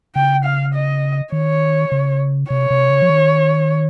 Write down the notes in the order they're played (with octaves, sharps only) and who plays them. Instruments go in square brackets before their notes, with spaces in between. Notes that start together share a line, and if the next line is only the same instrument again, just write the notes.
[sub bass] C#3 [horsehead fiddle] G5
[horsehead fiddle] F5
D#5
[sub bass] D#3 [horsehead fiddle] C#5
[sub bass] C#3
[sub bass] C3 [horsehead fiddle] C#5
[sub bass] C3
C#3
F3
D#3